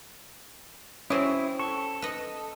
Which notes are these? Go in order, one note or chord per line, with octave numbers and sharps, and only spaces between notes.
C4 C#4 E4 G4 C#5 D#6
A4 C#6
B4 D#5